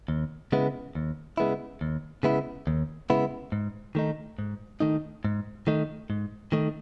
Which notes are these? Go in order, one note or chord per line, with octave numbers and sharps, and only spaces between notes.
D#2
C#3 G#3 B3 E4
D#2
C#3 G#3 B3 E4
D#2
C#3 G#3 B3 E4
D#2
C#3 G#3 B3 E4
G#2
D#3 A3 D#4
G#2
D#3 A3 D#4
G#2
D#3 A3 D#4
G#2
D#3 A3 D#4